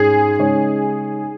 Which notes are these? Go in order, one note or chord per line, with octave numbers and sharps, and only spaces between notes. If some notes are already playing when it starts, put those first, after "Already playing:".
Already playing: G#2 G#3 C#4 G#4
C#3 G#3 D#4 C#5